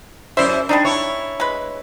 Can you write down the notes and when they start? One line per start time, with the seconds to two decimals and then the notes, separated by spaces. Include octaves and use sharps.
0.37 F#2 E4 C5 D5 E5
0.69 G3 G#3 D4 D#4
0.85 E4 C#5
1.40 G#3 B4